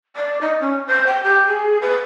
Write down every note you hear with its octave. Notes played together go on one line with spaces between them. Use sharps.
D5
D#4
C#4
C5
G5
G4
G#4
B4